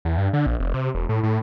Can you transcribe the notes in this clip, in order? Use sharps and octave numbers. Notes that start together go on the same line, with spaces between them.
E2
G2
D3
A#1
F1
C3
E1
A2
A2